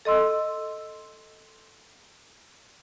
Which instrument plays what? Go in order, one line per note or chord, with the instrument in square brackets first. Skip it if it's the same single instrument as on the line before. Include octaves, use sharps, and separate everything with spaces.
[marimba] A4 D#5 C6 E6